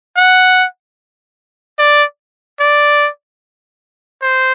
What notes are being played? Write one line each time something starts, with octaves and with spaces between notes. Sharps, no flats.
F#5
D5
D5
C5